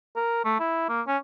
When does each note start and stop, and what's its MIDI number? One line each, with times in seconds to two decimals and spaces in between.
0.16 0.45 70
0.45 0.58 57
0.60 0.85 64
0.89 1.02 58
1.07 1.17 61